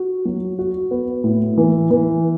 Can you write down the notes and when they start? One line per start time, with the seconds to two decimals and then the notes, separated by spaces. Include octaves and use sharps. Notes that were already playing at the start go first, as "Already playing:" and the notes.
Already playing: F#4
0.25 F#3
0.59 F#4
0.91 B3
1.24 A2
1.57 E3
1.91 E3